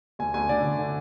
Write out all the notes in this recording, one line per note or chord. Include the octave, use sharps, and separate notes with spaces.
D2 G#5
D2 G#5
D3 D5
D3
D3